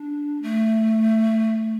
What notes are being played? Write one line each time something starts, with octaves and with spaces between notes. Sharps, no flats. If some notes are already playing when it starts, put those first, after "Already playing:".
Already playing: D4
A3